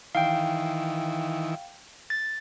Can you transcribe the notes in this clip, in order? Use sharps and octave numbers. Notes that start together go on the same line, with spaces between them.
D#3 E3 F5 G5
A6